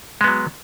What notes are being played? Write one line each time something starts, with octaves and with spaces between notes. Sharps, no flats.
F#3 G#3 B3